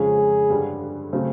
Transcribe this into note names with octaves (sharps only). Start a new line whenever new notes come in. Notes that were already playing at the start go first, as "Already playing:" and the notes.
Already playing: F2 C#3 F3 G#3 C#4 G#4
G2 D3 G3
C#3 F#3 A3 C4